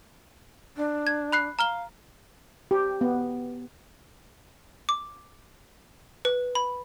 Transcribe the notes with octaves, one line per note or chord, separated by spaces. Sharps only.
D4
G#6
B5 F#6 C7
F5 A#5 F6 G7
G4
B3
D6
B4
B5